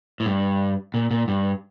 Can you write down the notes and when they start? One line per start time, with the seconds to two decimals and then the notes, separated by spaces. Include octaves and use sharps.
0.20 A2
0.26 G2
0.94 A#2
1.11 A#2
1.28 G2